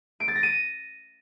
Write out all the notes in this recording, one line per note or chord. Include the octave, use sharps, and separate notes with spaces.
D7
A6
A#6
D#7